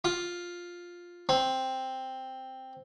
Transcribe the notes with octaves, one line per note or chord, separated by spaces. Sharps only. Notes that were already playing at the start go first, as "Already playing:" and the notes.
F4
C4